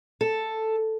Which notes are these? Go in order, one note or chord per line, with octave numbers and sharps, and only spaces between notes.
A4